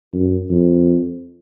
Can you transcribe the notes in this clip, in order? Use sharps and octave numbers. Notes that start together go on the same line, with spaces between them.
F#2
F2